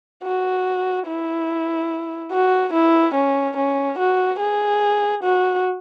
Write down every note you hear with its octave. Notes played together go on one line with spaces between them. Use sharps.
F#4
E4
F#4
E4
C#4
C#4
F#4
G#4
F#4